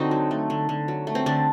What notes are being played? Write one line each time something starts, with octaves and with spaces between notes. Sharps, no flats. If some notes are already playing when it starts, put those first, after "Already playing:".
Already playing: D3 C4 D#4 F#4
F#3
A3
D3
D3
F#3
A3
C4
D3 D4